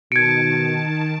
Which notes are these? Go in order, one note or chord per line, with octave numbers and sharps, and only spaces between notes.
B2 D#3 A5 G#6 C#7 D7